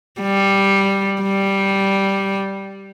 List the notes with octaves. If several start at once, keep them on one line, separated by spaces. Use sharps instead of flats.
G3
G3